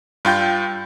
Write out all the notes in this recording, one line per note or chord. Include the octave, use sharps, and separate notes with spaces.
G2 F4 G5 G6